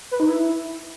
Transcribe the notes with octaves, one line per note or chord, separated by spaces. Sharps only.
B4
D#4
E4